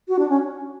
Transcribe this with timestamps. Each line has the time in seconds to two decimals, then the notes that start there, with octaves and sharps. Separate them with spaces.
0.08 F#4
0.19 D4
0.29 C#4